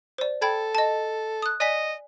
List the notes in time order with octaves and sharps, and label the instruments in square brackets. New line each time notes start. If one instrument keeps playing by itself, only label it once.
[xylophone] C5 D5
[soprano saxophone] A4 [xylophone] G5 B5 G#6
[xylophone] D#5 A5
D#6 F#6
[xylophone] D5 G#5 B6 [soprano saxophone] D#5